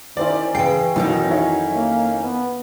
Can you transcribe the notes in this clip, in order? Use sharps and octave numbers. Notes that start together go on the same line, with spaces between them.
D#3 C#4 E4 C5 D5
C#3 E3 G5 C7
B1 F2 D#3 E3 F#3 D#4
E4 C#5
A#3
B3